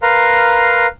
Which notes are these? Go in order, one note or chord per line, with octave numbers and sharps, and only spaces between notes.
A#4 B4 F5 A#5 C6